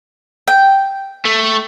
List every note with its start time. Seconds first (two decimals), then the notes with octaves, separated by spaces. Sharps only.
0.48 G5
1.25 A3